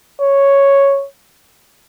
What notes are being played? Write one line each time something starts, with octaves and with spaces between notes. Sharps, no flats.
C#5